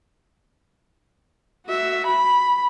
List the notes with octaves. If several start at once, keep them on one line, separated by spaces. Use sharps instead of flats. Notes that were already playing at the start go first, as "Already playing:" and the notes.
F#4 E5
B5